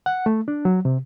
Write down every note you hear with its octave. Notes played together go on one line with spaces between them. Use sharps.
F#5
A3
D4
F#3
C3